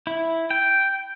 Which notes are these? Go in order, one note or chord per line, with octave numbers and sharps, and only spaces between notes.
E4
G5